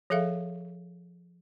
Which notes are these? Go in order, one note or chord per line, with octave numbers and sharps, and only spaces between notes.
F3 G#4 A4 E5 F5